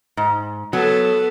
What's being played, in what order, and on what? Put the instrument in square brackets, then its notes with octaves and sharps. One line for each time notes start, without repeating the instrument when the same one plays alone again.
[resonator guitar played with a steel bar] G#2
[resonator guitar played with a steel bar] F#3 [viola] B3 A4